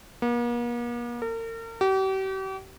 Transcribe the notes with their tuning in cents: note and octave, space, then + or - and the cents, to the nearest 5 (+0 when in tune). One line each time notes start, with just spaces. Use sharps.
A#3 +45
A#4 -40
G4 -40